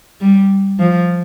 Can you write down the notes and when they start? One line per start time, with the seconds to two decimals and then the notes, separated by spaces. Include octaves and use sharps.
0.21 G3
0.79 F3